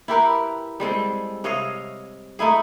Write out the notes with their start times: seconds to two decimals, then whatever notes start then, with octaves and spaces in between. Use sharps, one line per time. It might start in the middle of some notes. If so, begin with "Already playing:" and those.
0.08 E4 G4 A#4 B4
0.80 G3 G#3 C4 A4
1.44 C3 C#5 D#5 F5
2.39 A3 D#4 E4 G#4